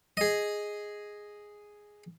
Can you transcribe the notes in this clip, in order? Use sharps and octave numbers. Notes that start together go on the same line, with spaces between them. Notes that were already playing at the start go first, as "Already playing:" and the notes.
G#4 D#5